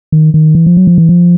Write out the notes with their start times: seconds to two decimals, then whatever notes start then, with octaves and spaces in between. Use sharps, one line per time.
0.12 D#3
0.34 D#3
0.55 E3
0.66 F3
0.77 F#3
0.87 F3
0.98 E3
1.09 F3